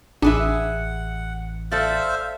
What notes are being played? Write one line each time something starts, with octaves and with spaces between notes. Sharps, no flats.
A1 D4 G#4 B4 E5 F#5
A4 C5 D5 E5 F5